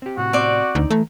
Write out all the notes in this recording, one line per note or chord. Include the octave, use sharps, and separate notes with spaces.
C4 G4
A2 C3 F#4
C4 D5
D2 D#4
E3 A3 A#5